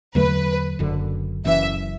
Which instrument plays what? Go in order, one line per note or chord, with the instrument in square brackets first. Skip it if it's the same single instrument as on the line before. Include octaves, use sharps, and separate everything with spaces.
[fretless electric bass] E2 D3 F#3 A3 [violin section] B4
[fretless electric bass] F#1 F#2 D3
[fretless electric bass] F#1 F#2 E3 [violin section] E5